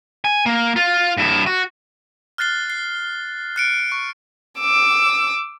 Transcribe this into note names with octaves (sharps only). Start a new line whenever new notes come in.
G#5
A#3
F4
G2 E4
F#4
F6 F#6 A6 C7 G7
C7
F#6 C#7 D7
C#6
D6 E6